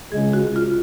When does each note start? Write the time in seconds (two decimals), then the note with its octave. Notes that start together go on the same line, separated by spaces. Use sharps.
0.12 C#2 C#3 G#3 G#4
0.33 F#4
0.56 F4